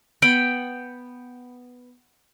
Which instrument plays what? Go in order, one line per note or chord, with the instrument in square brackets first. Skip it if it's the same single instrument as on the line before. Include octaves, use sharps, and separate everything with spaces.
[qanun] B3 G5 B5